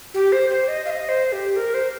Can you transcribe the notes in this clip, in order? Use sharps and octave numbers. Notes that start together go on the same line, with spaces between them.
G4
C5
C5
D#5
F5
D#5
C5
G4
A#4
C5